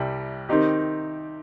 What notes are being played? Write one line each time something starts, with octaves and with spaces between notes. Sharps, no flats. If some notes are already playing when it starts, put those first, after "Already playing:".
Already playing: C2 C3 G3
D#3 C4 D#4 G4